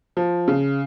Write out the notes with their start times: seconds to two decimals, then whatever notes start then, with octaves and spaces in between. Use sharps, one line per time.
0.17 F3
0.48 C#3